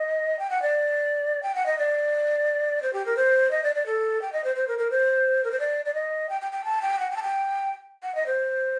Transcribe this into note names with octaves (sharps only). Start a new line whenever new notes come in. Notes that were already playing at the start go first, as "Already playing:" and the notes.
Already playing: D#5
G5
F#5
D5
G5
F#5
D#5
D5
C5
G4
A#4
C5
D#5
D5
D5
A4
G5
D#5
C5
C5
A#4
A#4
C5
A#4
C5
D5
D5
D#5
G5
G5
G5
A5
G5
F#5
G5
A5
G5
F#5
D#5
C5